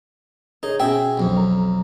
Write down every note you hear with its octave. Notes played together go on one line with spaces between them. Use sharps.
D#4 G#4 C#5
B2 C#4 G#4 E5 G5
B1 F2
A#5